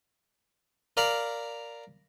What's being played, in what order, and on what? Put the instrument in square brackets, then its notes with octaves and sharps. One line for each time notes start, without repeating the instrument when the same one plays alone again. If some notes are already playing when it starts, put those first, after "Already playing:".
[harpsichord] A#4 D5 F5 A#5 B5